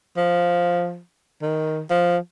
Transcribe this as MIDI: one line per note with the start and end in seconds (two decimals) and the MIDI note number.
0.17 1.00 53
1.42 1.81 51
1.90 2.17 53